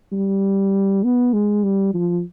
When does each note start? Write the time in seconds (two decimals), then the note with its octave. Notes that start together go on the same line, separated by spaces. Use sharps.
0.12 G3
1.04 B3
1.33 G#3
1.64 G3
1.94 F3